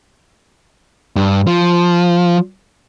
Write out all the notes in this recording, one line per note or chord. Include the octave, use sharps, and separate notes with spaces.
G2
F3